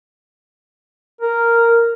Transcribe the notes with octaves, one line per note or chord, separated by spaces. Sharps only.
A#4